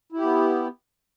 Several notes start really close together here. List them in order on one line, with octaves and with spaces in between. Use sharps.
E4 G4 B3